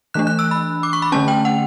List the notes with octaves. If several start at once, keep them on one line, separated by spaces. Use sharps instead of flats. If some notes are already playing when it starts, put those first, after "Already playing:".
E3 A3 D4 F#6
F#6
E6
B5
D6
C#6
B5
D3 A3 C#4 A5
G5
F#5